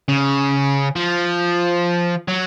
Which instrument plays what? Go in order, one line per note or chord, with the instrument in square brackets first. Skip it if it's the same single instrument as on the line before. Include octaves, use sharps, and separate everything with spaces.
[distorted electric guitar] C#3
F3
F#3